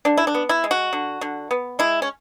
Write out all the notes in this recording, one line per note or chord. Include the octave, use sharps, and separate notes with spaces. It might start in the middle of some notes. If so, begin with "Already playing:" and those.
D3 D4
E4
D4
B3
E4
G#3
F#4
D3
D3
B3
G#3 E4
C#4